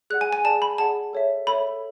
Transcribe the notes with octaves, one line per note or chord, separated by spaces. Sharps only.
G#4 D5 F#5 F#6
G#5
G#5
G#4 D5 F#5 A5
B5
G#4 D5 F#5 A5
A4 C#5 E5
A4 C#5 E5 B5